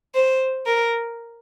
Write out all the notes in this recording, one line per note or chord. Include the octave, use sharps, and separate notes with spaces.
C5
A#4